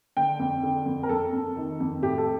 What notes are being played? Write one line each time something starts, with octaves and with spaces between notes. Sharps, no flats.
D3 G5
F2
D3
F2
A#4
F2 A4
F2
D#3
F2
A2 G4
A4